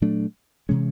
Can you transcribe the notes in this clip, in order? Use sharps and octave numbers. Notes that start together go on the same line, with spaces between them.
A#2 F#3 A3 D4
C3 E3 G#3 C#4